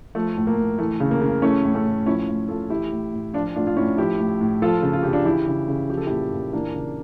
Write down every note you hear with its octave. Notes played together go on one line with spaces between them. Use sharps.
F3 A3
A2
A#3
A2
E3 A3
C#3
A#3
C#3
E3 A3 C#4
A2
A3 C#4
A2
F3 C#4 E4
A2
A2 F4 A4
E3 E4 G4
A2
A2
F3 D4 F4
A2 D4 F4
F4
A2 C#4 E4
F3 E4 G4
A2
A2
F3 F4 A4
C#3
F4
C#3 G4
D4 F4
E3 E4 G4
C#3
C#3
F3 G4
A4
A#2 E4 G4
A#2
E3 A#3 D4
C#3